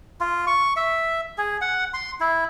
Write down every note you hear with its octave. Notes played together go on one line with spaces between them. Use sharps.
F4
C#6
E5
G#4
F#5
C6
E4